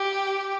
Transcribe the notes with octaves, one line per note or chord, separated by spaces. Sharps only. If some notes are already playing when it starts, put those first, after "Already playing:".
Already playing: G4